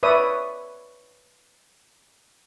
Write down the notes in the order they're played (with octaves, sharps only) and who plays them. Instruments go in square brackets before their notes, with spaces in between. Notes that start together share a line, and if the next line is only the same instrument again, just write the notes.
[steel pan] B4 C#5 D5 E5 D#6